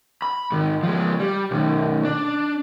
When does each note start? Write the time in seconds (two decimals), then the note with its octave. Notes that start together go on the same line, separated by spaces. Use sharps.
0.22 B5
0.52 G#2 D#3
0.83 F3 G#3
1.20 G3
1.51 B1 D#3
2.04 D4